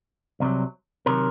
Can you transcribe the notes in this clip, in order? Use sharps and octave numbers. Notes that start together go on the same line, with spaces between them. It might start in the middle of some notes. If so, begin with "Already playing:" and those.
C2 C3 D#3 F#3
C3 D#3 F#3 A#4